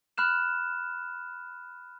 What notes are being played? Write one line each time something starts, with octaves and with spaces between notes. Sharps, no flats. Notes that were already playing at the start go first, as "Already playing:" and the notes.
B5 F6 F#6 E7